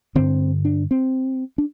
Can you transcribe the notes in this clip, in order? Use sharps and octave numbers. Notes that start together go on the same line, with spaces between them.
G2 D3 C4
D4
C4
D4